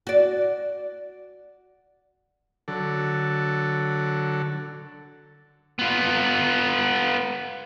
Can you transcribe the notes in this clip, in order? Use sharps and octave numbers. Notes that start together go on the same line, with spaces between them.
F#4 D5
D3 F#3 A4
B3 F4